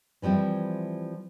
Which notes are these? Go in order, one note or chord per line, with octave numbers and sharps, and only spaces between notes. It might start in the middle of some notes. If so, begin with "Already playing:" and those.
E3 F3 G3 C4 E4